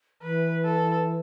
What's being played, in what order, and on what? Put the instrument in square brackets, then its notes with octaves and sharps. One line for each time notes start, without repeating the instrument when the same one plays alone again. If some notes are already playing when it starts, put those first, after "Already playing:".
[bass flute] E3 [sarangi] B4
[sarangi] A4